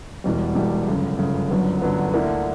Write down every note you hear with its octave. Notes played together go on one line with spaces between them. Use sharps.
E1 E2 B2 G3
E1 E2 B2 G3
G1 F#2 C#3
G1 F#2 C#3
G1 F#2 D3 F#3 B3
G1 F#2 D3 F#3 B3
D2 D3 A#3 E4